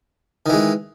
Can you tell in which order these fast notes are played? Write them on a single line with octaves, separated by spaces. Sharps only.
D#3 E3 G#3